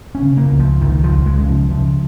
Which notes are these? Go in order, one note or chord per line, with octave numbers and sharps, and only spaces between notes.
C#4
C#3
A#3
C#2
F3
C#2 D#3
F3
C#2
G#3
C#3
F3
C#3 F3